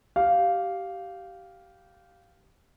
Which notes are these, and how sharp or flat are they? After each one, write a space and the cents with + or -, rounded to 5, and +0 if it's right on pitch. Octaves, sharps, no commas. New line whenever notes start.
G4 -20 F5 +0